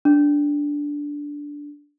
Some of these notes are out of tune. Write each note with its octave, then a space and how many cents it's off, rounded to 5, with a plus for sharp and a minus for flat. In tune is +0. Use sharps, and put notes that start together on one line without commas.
D4 -10